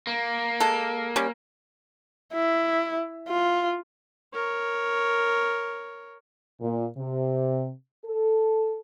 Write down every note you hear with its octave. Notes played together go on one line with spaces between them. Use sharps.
A#3
G#3 A4
G3 C#4
E4
F4
A#4 C#5
A#2
C3
A4